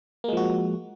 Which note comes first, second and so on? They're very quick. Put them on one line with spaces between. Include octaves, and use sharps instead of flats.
A#3 G#3 F3 F#4